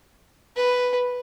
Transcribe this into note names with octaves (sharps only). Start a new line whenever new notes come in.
B4